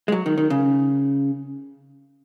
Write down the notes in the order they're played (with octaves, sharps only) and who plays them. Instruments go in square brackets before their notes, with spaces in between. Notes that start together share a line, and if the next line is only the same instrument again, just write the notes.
[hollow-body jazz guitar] G#3
F#3
D#3
D#3
C#3